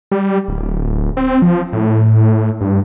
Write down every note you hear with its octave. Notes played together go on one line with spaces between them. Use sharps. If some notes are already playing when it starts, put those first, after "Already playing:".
G3
D1
C4
F3
A2
G2